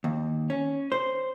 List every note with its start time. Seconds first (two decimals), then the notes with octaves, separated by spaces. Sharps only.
0.04 D#2
0.50 C#4
0.92 C5